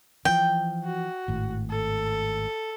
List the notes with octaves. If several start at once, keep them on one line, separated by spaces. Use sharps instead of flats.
E3 F3 G5
F#4
G#1 A2
A4